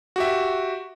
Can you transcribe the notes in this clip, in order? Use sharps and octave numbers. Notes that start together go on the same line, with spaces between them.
F#4 G4 E5